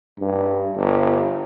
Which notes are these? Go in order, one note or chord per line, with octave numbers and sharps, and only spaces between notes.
G2
G1